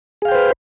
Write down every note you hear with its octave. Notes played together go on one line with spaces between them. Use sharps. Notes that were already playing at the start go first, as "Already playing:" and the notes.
G#4 B4 C5 F5 G5